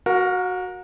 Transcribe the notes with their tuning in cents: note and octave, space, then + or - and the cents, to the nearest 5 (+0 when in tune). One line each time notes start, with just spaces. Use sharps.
F#4 +0 A#4 +0 F#5 -40